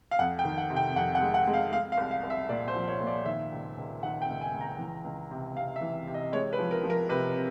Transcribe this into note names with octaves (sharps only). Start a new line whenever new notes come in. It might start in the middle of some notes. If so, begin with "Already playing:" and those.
F5
F2 F#5
G5
D#3
F#5
C3
G5
F2 F#5
F#5
G#3
F#5
G#3
F5
G#3 F5
F5
C2
F5
C2
E5
A#2 D5
C5
F3
C#5
A#2
D5
D#3 E5
C#2
C#2
D#3 F#5
G5
C#2
G#5
C#2
A#5
E3
C#2
C3
C3 F5
E5
E3
C3
D#5
G#3 C#5
B4
F3
A#4
F3
A#4
C3 B4